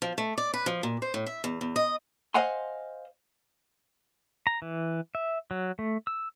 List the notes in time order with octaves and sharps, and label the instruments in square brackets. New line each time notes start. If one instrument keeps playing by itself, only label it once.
[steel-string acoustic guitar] F3
A3
D5
B4
F3
A#2
C5
A2
E5
E2
E2
D#5
[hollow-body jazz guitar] C5 D#5 F5 F#5 G#5 C6
[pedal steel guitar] A#5
E3
E5
F#3
A3
E6